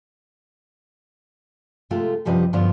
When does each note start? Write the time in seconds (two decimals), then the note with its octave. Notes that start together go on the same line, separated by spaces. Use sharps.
1.91 C3 G#3 A3 F4
2.25 F#2 C3 F3 G3 B4 D#5
2.53 G2 D3 F3 B3 D4 F4